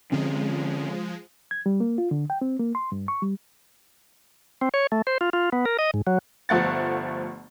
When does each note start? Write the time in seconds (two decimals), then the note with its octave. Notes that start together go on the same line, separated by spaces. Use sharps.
0.12 D3 F3 G#3 C4 C#4
1.51 G#6
1.66 G3
1.80 A#3
1.98 F4
2.11 D3
2.30 G5
2.41 C4
2.60 A#3
2.75 C6
2.92 G2
3.08 C#6
3.22 G3
4.61 C4
4.74 C#5
4.92 A3
5.07 C5
5.21 F4
5.33 F4
5.52 B3
5.65 A#4
5.79 D#5
5.94 G#2
6.07 F#3
6.49 G1 F3 A3 F#5 A6